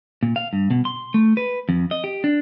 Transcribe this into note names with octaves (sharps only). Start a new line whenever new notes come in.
A#2
F5
G2
B2
C6
A3
B4
F2
D#5
G4
D4